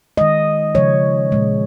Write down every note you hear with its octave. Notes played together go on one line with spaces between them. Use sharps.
D#3 G#3 D#5
C#3 F3 G#3 C#5
A#2 G#3